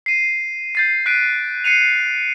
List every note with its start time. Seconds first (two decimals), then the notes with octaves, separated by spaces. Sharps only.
0.06 C7 D#7
0.75 G6 A6 C7
1.06 F#6 B6 C7 D7 D#7
1.64 C7 C#7 D#7 F7